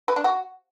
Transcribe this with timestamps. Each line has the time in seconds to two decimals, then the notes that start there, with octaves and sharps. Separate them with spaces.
0.08 B4
0.16 D4
0.24 F#4